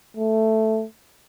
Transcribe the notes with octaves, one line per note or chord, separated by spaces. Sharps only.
A3